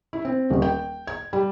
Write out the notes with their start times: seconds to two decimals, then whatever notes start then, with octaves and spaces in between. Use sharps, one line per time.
0.13 E4
0.25 C4
0.50 D#1
0.62 G5
1.07 G#6
1.33 G3